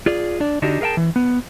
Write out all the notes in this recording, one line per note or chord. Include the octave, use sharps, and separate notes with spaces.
F4 G#4 D5
D4 D5
D3 D4 D#4 F#4 G4
G#4 A#4 F5 G5 A5
E3
B3